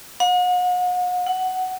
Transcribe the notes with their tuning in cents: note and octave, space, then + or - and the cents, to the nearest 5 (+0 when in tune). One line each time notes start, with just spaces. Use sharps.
F#5 -40
F#5 +10